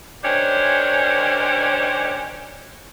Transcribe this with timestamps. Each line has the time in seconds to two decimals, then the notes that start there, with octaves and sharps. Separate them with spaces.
0.24 D#3 C#4 D4 G4 C5 C#5